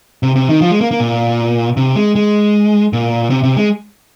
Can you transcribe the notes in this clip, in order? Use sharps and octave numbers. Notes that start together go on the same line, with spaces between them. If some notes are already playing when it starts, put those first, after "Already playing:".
C3
C3
D#3
F3
G#3
A#3
A#3
A#2
C3
G#3
G#3
A#2
C3
C3
G#3